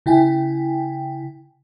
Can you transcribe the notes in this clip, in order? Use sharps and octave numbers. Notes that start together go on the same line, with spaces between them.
C#3 E4 G5 G#5